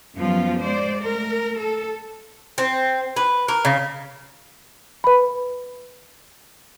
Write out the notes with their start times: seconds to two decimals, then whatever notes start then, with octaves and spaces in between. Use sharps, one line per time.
0.18 F#2 F3 G3 B3 F4
0.60 G#3 C5 D5
1.03 A3 A#4
1.60 A4
2.58 C4
3.16 B4
3.48 A#4
3.65 C#3
5.04 B4 B5